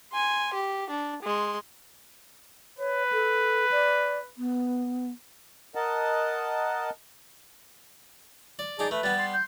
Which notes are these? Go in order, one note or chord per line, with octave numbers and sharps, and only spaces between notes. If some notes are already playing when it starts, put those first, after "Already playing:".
G#5 C6
G4
D4
G#3 C6
B4 C#5
A4
D5
B3
A#4 D#5 F#5 A5
D5
D#4 G#4 D5 A5 D6
A3 B4
G3 B3 A6
C6
G6